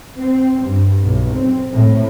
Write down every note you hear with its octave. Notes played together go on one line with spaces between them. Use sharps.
C4
G2
B1
C4
A2